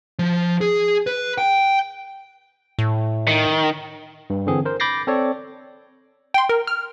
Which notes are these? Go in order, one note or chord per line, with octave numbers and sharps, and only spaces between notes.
F3
G#4
B4
G5
A2
D#3
G2
D3 E3 C4 G#4
A#4 C5
B5 D6 G6 A6 A#6 C7
C4 A4 C#5 D5
G5 C6
A#4
F6